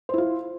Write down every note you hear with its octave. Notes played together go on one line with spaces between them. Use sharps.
E4 F4 C5